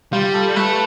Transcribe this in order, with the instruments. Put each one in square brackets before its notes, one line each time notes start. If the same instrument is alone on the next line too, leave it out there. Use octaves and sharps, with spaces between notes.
[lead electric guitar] G3 [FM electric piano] F4
[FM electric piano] A4
[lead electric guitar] A3 [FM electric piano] B4